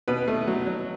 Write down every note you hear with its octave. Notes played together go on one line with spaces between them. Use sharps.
B2 B4
A3
F#3
F#3